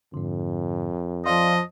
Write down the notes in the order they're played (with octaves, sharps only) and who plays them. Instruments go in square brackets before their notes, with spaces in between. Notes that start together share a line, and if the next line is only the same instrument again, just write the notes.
[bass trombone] F2 [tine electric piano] G#2 D3
[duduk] F3 [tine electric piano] D5 F5 C6 [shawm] D#5